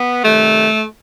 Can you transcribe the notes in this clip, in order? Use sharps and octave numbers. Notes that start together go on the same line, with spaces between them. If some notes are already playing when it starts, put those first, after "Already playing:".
Already playing: B3
C3 D#3 G3 A3